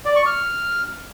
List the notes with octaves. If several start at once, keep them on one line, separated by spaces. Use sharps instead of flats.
D5
C#6
F6